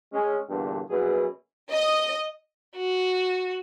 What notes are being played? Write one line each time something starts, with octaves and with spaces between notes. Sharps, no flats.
G#3 C#4
E2 G2 A#2 D3
A#1 F#2 B2 G#4 B4
D#5
F#4